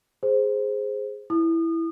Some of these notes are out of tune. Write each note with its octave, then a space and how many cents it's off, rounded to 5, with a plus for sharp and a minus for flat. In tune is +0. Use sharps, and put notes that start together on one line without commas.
G#4 +0 C5 +0
E4 +0 D#6 -35